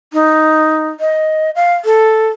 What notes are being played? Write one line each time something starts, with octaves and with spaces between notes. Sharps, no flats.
D#4
D#5
F5
A4